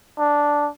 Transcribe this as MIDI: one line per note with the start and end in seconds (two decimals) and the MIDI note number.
0.19 0.69 62